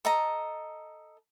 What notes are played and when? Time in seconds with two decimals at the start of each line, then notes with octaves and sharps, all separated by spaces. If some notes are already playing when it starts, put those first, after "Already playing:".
0.05 A4 D#5 A#5